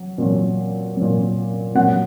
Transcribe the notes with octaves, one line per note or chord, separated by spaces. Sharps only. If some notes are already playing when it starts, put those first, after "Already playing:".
Already playing: F#3
A#2 F#3
A#2 F#3
A#2 F#3 F#5